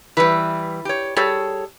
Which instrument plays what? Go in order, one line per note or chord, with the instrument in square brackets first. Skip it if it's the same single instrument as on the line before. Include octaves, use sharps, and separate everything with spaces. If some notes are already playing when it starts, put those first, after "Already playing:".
[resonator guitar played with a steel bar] E3 G3 [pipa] B4
[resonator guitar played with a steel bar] G4 C#5
[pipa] G3 [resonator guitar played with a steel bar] G#4 A4 C#5